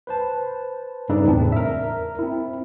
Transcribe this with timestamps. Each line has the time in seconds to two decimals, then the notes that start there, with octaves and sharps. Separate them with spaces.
0.07 B4 C5 A5
1.09 G2 C#3 D#4 A4 B4 D5
1.27 E2 A2 C4 D4
1.52 A#4 E5
2.19 C4 E4